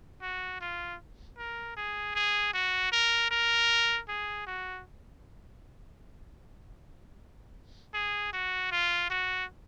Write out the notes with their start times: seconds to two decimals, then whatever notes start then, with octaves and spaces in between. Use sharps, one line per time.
0.22 F#4
0.60 F4
1.37 A#4
1.76 G#4
2.15 G#4
2.53 F#4
2.92 A#4
3.31 A#4
4.08 G#4
4.46 F#4
7.94 G#4
8.33 F#4
8.71 F4
9.10 F#4